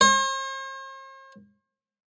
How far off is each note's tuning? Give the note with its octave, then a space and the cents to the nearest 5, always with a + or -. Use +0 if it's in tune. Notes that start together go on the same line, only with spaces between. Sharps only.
C5 +45